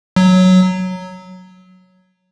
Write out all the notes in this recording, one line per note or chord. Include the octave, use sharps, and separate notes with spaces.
F#3